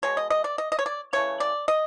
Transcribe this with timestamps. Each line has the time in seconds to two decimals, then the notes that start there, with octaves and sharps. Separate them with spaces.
0.03 B2 G#3 C#5
0.17 D#5
0.30 D#5
0.44 D5
0.58 D#5
0.72 D#5
0.79 C#5
0.86 D5
1.13 C#3 E3 A3 C#5
1.40 D5
1.68 D#5